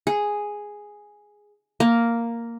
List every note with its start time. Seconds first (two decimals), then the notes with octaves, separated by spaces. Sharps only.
0.07 G#4
1.80 A#3